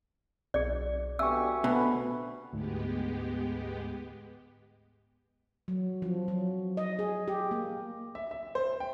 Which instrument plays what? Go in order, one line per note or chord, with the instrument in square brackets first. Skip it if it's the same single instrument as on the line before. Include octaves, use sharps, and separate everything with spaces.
[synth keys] B1 [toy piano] G#4 D5
[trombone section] B2 D3 G4 [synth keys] E5 G#5 C#6 [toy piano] E6
[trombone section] D2 B4 [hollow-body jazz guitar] B2
[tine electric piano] D2 G#2 [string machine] G#3 B3 G4
[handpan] F#3
F3
F#3
D#5
G#4
G4
A#3
[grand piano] E5
E5
C5
G5